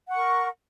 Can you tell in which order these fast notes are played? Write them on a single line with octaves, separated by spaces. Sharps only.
F#5 C#6 A#4